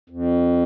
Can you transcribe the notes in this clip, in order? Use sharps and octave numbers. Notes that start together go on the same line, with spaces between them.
F2